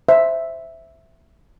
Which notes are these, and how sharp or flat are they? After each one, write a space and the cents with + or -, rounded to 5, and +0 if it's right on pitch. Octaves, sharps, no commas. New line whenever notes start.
C5 +0 E5 +0